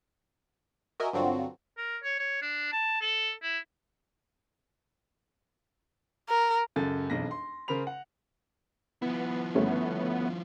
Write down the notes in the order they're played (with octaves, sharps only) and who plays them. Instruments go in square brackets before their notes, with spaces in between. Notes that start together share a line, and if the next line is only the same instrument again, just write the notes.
[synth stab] F#4 A#4 D#5 E5 G#5
G2 D3 F#3 C4 F4 F#4
[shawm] A#4
C#5
C#5
D4
A5
A4
E4
[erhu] A#4
[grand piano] C#2 F#2 A4 A6
E1 B1 F2 A#6
C6
C#3 A#4 C5 B5 F7
F#5
[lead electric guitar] F3 E4 [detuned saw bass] B3
[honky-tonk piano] G1 A3 C#4